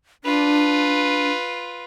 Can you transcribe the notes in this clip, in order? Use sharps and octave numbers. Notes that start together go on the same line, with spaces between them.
D4 F4 B4